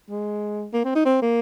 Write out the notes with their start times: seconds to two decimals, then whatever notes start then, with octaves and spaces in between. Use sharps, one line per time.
0.10 G#3
0.73 A#3
0.85 C4
0.95 D#4
1.05 C4
1.21 A#3